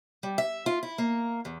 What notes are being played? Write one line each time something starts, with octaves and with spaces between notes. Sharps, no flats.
G3
E5
F4
E4
A#3
E2